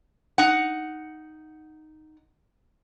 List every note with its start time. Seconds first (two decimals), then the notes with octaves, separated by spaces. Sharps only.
0.38 D#4 F#5